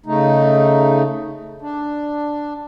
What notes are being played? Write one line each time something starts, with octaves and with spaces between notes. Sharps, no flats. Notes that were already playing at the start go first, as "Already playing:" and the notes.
C#3 A3 D#4
D4